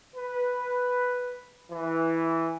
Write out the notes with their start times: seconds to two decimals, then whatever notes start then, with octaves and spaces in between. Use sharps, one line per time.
0.16 B4
1.72 E3